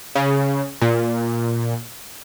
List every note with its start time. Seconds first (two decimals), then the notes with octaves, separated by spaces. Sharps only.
0.15 C#3
0.82 A#2